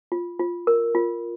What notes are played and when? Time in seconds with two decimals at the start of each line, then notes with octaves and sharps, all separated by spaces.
0.12 F4
0.40 F4
0.67 A#4
0.95 F4